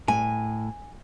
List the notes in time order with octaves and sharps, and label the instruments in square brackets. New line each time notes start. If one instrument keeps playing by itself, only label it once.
[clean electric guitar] A2 [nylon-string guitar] G#5